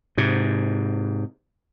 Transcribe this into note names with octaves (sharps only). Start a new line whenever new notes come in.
G#2 C3